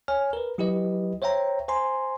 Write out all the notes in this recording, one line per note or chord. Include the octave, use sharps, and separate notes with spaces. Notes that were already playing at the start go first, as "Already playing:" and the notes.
C#5 G#5 F6
A#4 B4
F#3 E4 G4 B4 D#5
C5 C#5 E5 G5 A#5
C5 G#5 A#5 C6